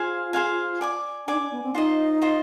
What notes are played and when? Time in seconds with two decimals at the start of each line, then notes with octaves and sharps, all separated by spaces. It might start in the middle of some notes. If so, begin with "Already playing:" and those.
Already playing: F4 G#4 C5 F5 G#5
0.33 G#4 C5 F5 G#5
0.81 D5 G#5 D6
1.27 D4 D5 G#5 D6
1.34 D#4
1.39 D4
1.52 B3
1.63 C4
1.75 D#4 F4 C5 D#5
2.22 F4 C5 D#5